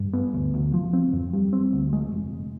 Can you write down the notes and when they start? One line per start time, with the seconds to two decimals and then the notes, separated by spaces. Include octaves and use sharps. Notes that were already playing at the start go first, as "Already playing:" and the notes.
Already playing: G2
0.13 B3
0.34 D2
0.54 D2
0.74 F3
0.93 C4
1.13 F2
1.33 G3
1.53 C4
1.73 D2
1.93 G#3
2.12 F1
2.33 F1